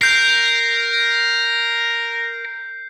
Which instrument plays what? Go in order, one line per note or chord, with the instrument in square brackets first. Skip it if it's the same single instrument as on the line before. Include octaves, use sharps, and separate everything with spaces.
[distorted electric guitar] A#4 [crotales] G6 C7